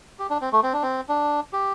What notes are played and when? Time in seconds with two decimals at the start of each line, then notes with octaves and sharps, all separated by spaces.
0.19 G4
0.30 D4
0.41 C4
0.52 A3
0.63 C4
0.73 D4
0.83 C4
1.09 D4
1.53 G4